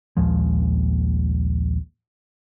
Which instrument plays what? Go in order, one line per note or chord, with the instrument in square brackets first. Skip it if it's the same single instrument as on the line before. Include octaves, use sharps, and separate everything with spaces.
[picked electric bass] A#1 D#2 F3 G#3